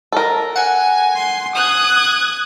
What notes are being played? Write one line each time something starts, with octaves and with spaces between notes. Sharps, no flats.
A4 A#4
F#5 G#5
C6
D#6 F#6 G#6